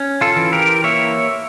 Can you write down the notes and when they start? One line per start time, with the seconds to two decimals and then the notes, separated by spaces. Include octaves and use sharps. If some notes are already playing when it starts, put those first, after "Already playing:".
Already playing: C#4
0.21 F4 A4
0.36 E3
0.52 G4 A#4
0.84 A#3 C#5 E5